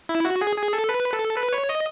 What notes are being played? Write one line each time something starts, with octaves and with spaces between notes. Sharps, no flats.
E4
F#4
G#4
G#4
A4
B4
A4
B4
C#5
D#5